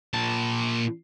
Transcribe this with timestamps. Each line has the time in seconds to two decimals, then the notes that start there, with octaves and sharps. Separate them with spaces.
0.14 A#2 A5